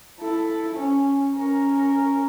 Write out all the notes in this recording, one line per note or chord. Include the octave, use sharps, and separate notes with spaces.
E4 A4
C#4
C#4 A#4